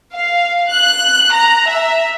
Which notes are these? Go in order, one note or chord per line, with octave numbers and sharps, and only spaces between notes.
F5
F#6
A#5
E5